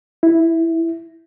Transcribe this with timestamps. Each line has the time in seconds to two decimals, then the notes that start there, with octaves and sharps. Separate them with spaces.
0.23 E4